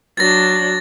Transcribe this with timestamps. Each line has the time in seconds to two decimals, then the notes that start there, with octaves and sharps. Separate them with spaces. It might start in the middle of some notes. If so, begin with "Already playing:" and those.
0.17 F#3 D4 A6 A#6